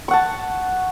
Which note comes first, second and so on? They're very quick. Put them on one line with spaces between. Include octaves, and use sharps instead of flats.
C#6 F#5 A5